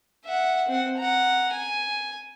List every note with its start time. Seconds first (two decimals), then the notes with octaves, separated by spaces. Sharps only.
0.25 E5 F#5
0.68 C4 F#5
0.98 F#5 A#5
1.52 G#5